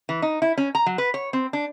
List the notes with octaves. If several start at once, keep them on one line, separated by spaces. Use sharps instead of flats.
E3
D#4
E4
C#4
A#5
F#3
B4
C#5
C4
D4